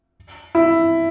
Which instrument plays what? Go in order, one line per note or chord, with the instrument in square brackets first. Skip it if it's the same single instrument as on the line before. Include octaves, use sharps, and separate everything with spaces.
[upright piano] E4